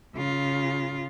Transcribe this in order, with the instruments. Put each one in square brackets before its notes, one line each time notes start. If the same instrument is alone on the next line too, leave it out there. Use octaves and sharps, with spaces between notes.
[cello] C#3 F4